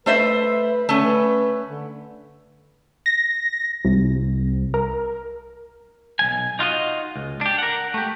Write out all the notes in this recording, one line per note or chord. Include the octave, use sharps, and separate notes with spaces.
A3 B4 C5 E5
D3 A3 C#4
B4
D3
A#6
C2
A#4
B1 F3 G#5
D#4 F4 F#4 D#5
C#2
D4 G4
A#4 F#5
A3 G4